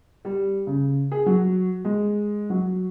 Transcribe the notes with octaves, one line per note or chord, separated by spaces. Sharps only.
G3
C#3
G#4
F#3
G#3
F#3